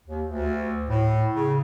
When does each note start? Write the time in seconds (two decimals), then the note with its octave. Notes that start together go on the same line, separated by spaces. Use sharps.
0.07 D#2
0.28 D2
0.88 A2
1.33 C#3